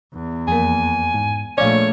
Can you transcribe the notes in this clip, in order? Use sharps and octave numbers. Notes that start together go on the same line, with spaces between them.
E2
F2 A#3 G#5
G#2
A#1 A3 C#5 D5 F5